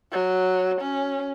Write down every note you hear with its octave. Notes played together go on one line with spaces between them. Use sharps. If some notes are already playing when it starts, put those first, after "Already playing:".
F#3
C#4